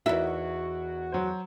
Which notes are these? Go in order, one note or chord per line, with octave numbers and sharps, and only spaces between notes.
E2 D#4 E4 F#4 A#4 E5
F#3 C5